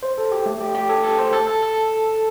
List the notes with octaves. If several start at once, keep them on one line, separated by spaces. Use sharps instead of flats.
C5
A4
G4
A3
G4
G4
A4
A4
C5
A4
A4
A4